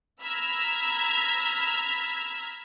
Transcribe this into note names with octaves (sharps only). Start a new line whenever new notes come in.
A#5 B5 E6 F6 G#6 B6